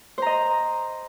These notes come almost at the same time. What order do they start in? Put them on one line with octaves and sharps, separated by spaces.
C5 A#5 D#5